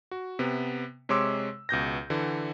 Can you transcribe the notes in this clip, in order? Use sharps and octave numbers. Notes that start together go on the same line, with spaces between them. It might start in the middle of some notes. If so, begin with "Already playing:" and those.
F#4
C3 B3
C3 G#3 C#5 C6 D6 E6
C#2 B2 G6 A#6
D3 E3